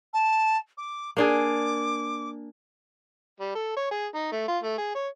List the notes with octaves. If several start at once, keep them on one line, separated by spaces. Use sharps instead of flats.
A5
D6
A#3 D4 G#4 D6
G3
A4
C#5
G#4
D#4
A3
F4
A3
G#4
C#5